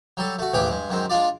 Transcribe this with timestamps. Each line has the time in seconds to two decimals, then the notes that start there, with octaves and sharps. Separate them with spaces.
0.17 F#3 G3 A4
0.39 A3 F#4
0.54 A1 D#2 E3 G4 G#4 G5
0.70 G2 G#3
0.89 F#2 D#3 G#3 C4
1.10 G#3 D4 F4 D5